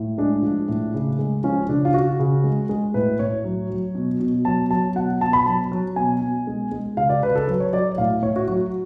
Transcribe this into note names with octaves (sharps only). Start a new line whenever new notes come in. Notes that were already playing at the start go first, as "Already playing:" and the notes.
Already playing: A2
G#3 D4
F3
A2
C#3
G#3
F3 C#4
C#3 D4
F4
C#3 F#4
C#3
G#3
G#3
A2 B4
A2 C#5
F#3
F#3
B2
B2
F#3 A5
F#3 A5
B2 F#5
B2 A5
B5
F#3 A5
F#3
B2 G#5
B2
G#3
G#3
C#3 F5
D5
C#3 B4
A4
F#3 B4
C#5
F#3 D5
A2 F5
A2 C#5
F#4
F#3 F#4